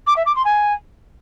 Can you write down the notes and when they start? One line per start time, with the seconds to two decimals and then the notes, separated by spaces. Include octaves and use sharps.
0.07 D6
0.16 E5
0.26 D6
0.35 C6
0.45 G#5